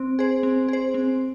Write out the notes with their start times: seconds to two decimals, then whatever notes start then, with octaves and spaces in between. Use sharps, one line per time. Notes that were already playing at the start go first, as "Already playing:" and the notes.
Already playing: C4
0.19 G#4 C5
0.43 C4
0.68 G#4 C5
0.94 C4